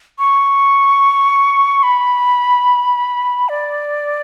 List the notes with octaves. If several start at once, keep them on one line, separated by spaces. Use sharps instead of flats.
C#6
B5
D5